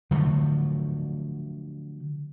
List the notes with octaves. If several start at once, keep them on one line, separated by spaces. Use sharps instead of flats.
D3 F3 F#3 A3